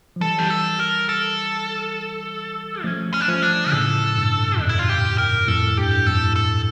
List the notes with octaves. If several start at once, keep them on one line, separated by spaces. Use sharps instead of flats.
F3
E3 G3 A4
G4
A4
A#4
A4
F3 A3 C#4
C#4
D4
F3 A3 C#4
D4
D3
A2 C#3 A4
G2 A#2
F2 A2 D4
E4
F4
G4
A#4
F2 A2 A4
G2 G4
F2 A2 A4
A4